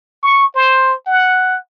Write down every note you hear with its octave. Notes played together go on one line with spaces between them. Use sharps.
C#6
C5
F#5